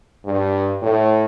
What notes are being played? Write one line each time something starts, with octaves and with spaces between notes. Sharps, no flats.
G2
A2